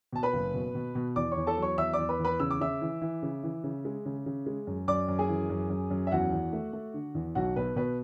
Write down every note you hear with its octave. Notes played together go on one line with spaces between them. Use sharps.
B2 A5
B4 B5
F#1
B2
B2
B2
E2 D5 D6
C#5 C#6
E2
A4 A5
F#3
C#5 C#6
E2 E5 E6
D5 D6
E2
B4 B5
E2
B4 B5
C#3 E6
D6
C#3 E5 E6
E3
E3
C#3
E3
C#3
G#3
C#3
C#3
G#3
F#2
F#2 D5 D6
F#2
G#4 G#5
E3
F#2
F#2
F#2
E5
E2 F#4 F#5
E2
A3
A3
D3
E2
B1 F#4 F#5
B2 B4
B2 B4